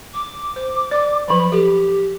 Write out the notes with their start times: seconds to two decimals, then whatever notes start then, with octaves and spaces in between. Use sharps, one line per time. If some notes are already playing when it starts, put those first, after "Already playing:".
0.14 D6
0.56 C5
0.91 D5
1.28 F3 F#3 B5
1.52 G4 A4